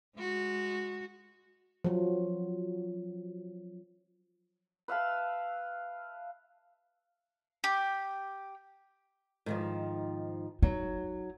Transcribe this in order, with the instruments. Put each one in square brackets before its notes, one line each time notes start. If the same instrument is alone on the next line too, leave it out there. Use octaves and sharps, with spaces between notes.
[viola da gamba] G#3 F#4
[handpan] F3 F#3
[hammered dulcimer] B4 E5 F5 A5
[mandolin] G4
[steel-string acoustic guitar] G#2 D#3 F3
[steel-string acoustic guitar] F#3 [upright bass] D#4